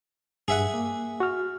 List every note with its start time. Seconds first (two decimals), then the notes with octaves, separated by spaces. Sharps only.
0.48 G2 G#4 E5 F#5
0.74 A#3
1.20 F#4 F6